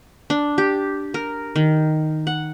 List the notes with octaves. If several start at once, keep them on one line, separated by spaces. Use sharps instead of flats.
D4
G4
A#4
D#3
F#5